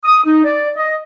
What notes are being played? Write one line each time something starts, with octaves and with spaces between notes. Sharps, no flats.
D#6
D#4
D5
D#5